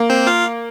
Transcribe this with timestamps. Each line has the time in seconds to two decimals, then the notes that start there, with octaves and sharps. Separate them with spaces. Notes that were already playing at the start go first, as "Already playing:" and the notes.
Already playing: A#3
0.10 C4 C5
0.27 F4 F5